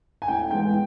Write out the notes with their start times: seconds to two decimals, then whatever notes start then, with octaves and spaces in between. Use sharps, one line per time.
0.22 G#5
0.28 A2 G5
0.51 E3 G#3 B3 G5